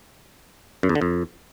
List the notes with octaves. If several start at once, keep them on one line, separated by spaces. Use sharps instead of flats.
F#2
E2
D3
F2